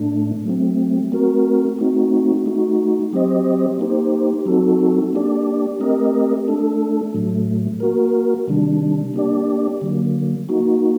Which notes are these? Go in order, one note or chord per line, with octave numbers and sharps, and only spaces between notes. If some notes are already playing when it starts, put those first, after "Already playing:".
Already playing: A2 A3 D4
F#3 A3 C4
A3 C4 F#4 A#4
A3 C4 D#4 F#4
A3 D#4 F#4
F#3 C4 G4 C5 D#5
A#3 D#4 G4 C5
F#3 C4 D#4 F#4 A4
A#3 D4 G4 D5
A3 C4 G4 A#4 D#5
A3 D4 A4
A2 F#3 A3
A#3 F#4 A#4
C3 D#3 G3 D4
A#3 D4 G4 D5
D3 F#3 A#3
A#3 D#4 F#4